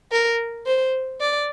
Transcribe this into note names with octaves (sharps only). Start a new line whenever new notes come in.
A#4
C5
D5